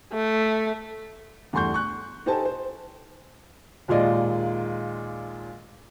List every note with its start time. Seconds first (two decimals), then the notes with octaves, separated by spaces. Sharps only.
0.12 A3
1.53 E2 G2 A3 C6 C#6 G6
1.74 C#6 F#6
2.26 D#4 G4 A4 C5 G#5 A5
2.45 C5
3.88 D#2 A#2 G#3 F4 D5 D#5